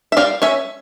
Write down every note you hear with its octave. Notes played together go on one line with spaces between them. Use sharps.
E5
G3 D5 F5
C#4 C#5 E5